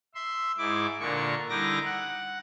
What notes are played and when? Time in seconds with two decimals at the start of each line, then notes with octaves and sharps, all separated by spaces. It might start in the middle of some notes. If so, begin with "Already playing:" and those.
0.15 E5 C6
0.58 G#2 E4 D6
1.00 A#2 D3 A#3 C#6
1.49 D3 G3 D#4 E4 D6 A#6
1.84 F#5